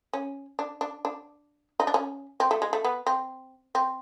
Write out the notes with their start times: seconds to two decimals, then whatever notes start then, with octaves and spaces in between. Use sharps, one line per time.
0.13 C#4
0.59 D4
0.81 D4
1.05 D4
1.80 D#4
1.87 D4
1.94 C#4
2.40 C4
2.51 A3
2.62 G#3
2.73 A3
2.84 B3
3.07 C4
3.75 C4